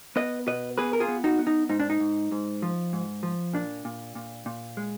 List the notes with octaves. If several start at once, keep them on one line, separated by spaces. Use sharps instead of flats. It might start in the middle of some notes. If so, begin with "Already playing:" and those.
B3 B4 D#5
B2 B4 D#5
B3 G#4 B4
A#4
F4 G#4
B3
D#4 F#4
B3
D#4
G#2 D#4
D4
D#4
G#2
G#2
F3
G#2
F3
A#2 D4
A#2
A#2
A#2
G#3